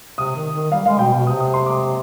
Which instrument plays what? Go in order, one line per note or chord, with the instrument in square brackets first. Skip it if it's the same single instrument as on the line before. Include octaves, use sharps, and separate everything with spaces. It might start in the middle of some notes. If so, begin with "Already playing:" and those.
[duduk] C3 [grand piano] D#6
[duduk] D#3
D#3
[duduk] G3 [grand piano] F5
[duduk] G#3 [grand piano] F5
[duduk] B2 [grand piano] G5
[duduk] B2
[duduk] C3 [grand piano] D#6
[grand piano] D#6
C6
D6